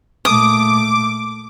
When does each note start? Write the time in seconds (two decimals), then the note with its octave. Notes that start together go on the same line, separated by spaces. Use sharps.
0.25 A#2 A3 D6 D#6